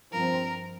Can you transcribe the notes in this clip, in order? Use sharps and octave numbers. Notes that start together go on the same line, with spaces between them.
G2 F3 C4 A#4